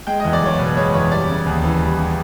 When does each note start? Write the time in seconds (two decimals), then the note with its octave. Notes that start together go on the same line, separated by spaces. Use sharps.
0.07 G#3 G5
0.20 D#5
0.24 E2
0.33 D5
0.42 F#1 C#5
0.59 B2 B4
0.77 G#3 C#5
0.94 E2 C#5
1.11 G3 D5
1.29 C#3
1.46 D#2
1.64 E3
1.81 G3
1.99 C#3